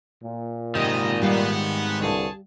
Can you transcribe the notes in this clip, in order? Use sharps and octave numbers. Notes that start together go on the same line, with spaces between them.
A#2
G#2 C3 D#3 D#5
G3 B3 F5
C2 G2 D3 G#4 C#5 A5